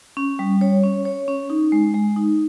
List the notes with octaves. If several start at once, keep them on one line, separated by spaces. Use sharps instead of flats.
C#4
G3
C#5
C#4
C#5
C#4
D#4
G#3
G#3
D#4